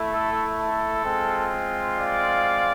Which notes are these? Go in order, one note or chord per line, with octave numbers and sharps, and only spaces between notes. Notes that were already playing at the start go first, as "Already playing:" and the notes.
Already playing: A3 E4
A4
A4
G#3 C4 F4
D5 F5